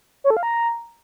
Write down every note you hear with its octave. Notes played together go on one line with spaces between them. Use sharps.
C#5
A4
F5
A#5